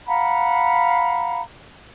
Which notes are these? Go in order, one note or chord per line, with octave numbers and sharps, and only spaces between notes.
F5 F#5 A#5 B5